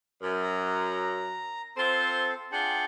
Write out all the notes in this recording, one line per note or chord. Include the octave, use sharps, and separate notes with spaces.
F#2
A#5
C4 F4 A4 C5
D4 F4 G#4 F#5 G5